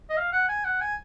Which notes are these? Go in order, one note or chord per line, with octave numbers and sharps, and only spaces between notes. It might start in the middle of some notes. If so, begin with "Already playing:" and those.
D#5
F5
F#5
G#5
F#5
G#5